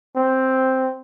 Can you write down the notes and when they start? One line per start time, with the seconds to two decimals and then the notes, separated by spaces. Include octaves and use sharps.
0.16 C4